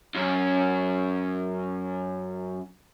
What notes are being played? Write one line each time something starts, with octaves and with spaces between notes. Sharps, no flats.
F#2 C#4